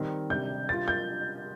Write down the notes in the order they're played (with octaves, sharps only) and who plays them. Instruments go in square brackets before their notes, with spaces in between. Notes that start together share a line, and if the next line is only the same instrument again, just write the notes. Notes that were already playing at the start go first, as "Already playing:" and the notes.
Already playing: [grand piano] D#3 G3 C4 D#4
[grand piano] C3 G3 D4 [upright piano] G6
[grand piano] C3 G3 D4 F4 [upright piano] A6
[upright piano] G6